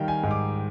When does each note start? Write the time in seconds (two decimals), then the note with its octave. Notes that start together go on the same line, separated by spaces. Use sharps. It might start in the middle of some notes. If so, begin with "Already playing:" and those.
Already playing: D#3 G3 F5 G5
0.08 G#5
0.23 G#2
0.31 D6